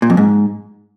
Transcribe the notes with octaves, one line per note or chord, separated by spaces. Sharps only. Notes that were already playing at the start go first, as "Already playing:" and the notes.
A#2
F2
G#2